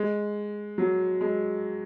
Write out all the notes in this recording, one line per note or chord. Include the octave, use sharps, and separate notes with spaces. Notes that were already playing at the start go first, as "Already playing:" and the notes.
Already playing: G#3
F#3
G#3